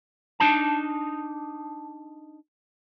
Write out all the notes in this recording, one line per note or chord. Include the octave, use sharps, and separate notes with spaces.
D4 D#4 A5